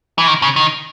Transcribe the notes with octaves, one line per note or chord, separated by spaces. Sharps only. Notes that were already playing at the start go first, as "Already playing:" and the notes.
E3
D#3
C#3
D#3